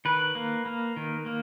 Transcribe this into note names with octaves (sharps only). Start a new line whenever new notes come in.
D#3 B4
A#3
A#3
D#3
A#3